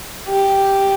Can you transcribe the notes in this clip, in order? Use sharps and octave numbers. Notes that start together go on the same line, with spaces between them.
G4